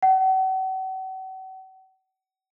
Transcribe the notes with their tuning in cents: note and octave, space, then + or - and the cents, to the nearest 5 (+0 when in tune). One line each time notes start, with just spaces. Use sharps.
F#5 +40